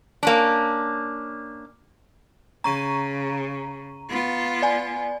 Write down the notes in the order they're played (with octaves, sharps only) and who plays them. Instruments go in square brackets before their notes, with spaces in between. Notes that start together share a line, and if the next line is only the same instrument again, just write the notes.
[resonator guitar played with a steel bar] A#3 C#4 D4
[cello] C#3 [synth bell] A#5 C#6 D#7
[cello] B3 F4
[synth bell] D5 G#5